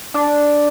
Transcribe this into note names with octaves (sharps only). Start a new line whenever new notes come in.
D4